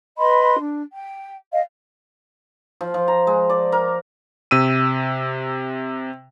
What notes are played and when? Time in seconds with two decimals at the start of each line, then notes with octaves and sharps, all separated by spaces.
0.17 B4 D#5 B5 C6
0.58 D4
0.92 G5
1.52 D#5 F5
2.81 F3
2.94 F3
3.08 A#5
3.27 G#3
3.50 D5
3.72 A#4
4.51 C3 E6 D#7